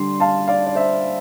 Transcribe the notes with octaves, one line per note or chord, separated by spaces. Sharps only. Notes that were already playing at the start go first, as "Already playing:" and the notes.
Already playing: D3 G3 D4 C6
F5 A5
D5 F5
D5
C5 E5